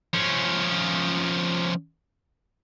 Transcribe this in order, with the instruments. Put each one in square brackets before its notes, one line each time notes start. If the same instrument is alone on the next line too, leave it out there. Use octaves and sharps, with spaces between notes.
[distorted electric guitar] F3 C#4